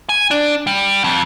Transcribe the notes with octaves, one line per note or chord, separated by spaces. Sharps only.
G#5
D4
G3
F2